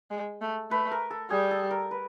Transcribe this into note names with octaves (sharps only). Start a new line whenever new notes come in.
G#3
A3
A3 B4
A#4
A4
G3 G#4
A4
A#4
B4